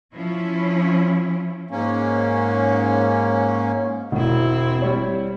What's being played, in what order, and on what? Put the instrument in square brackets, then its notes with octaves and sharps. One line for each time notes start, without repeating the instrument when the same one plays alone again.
[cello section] F3 C#4 E4
[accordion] G#2 A#3 C#4
[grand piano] E1 [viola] C4 E4
[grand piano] G3 C#5